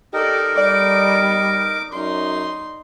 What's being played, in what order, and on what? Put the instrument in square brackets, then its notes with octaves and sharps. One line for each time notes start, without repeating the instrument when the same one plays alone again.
[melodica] D#4 A#4 D#5 [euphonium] G4 [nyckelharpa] A4 D5
[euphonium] G3 [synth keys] D5 [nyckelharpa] D6
[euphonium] F#2 [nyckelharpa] D#4 C6